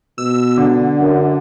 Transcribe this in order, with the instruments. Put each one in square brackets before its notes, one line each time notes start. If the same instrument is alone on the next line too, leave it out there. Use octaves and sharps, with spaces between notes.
[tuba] B2 [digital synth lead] E6
[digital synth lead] D3
[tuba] F#2